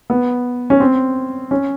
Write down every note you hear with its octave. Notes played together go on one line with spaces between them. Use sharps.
B3
C#4
C4
C#4